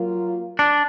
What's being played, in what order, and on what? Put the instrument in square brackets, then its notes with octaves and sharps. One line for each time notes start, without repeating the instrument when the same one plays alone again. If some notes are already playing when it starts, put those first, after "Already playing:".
Already playing: [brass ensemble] F#3 A#3 F4
[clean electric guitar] D4